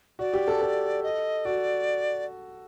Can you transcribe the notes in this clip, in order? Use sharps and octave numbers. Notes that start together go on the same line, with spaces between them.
F#4 D5
G4
A4
A4
D#5
F#4 D5